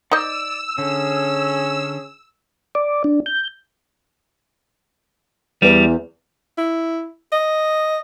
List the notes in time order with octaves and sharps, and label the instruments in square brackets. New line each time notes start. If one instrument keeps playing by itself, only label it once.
[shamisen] D#4 C5 D#5 [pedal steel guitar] D5 [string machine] E6
[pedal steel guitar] D3 [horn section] C#4 G#4
[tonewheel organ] D5
D4
G6
[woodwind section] E2 [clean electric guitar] G3
[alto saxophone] E4
D#5